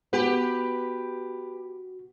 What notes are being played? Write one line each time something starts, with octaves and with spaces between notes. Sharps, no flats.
B3 F#4 G4 B4